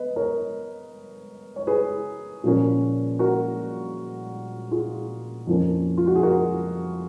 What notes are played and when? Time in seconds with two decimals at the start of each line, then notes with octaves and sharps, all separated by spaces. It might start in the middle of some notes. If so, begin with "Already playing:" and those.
Already playing: B3 B4 D#5
0.16 A#4 C#5
1.56 C#5
1.67 G#4 B4
2.44 A#2 F3 A#3 C#4
3.19 F#4 A#4
4.71 F4 G#4
5.47 F2 F3 A#3 C#4
5.98 F4
6.07 F#4
6.16 G#4
6.23 F#4 A#4